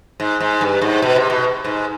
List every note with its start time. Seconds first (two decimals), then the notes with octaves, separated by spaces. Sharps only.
0.20 G#2
0.40 G#2
0.61 G2
0.81 G#2
1.02 B2
1.16 C3
1.30 B2
1.65 G#2